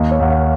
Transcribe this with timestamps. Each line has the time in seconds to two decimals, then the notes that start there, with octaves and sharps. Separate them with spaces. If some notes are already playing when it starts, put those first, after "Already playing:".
Already playing: D#2 D#5
0.11 C#5
0.20 D#2 F#5
0.30 F5